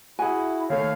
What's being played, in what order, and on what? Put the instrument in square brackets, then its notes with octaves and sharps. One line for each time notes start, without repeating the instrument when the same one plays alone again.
[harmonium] E4 [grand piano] F#4 G#4 [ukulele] G#5
[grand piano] D#2 A3 [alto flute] C#5 [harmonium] F5